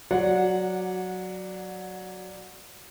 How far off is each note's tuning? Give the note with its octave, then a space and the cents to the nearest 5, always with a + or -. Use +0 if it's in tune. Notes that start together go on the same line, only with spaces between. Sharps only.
F#3 +0 D5 +0 F#5 -20